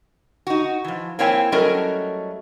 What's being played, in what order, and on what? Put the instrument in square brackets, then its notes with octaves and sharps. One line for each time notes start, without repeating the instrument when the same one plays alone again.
[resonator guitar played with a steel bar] D#4 F#4
E3 F3
A#3 C4 E4 C#5 G5 G#5
F#3 G3 A3 C#4 A#4 D#5